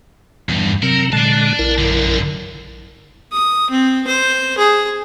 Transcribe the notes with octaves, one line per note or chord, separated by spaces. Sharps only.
E2 G2
C3 F#3 C4 A#4
A#2 D3 G#3 D5 A5
A#1 E4 A#4
F#2 D3
D#6
C4
C5
G#4